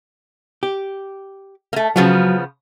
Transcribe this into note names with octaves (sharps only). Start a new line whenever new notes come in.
G4
A3 A#3
C#3 F3 F#3 B3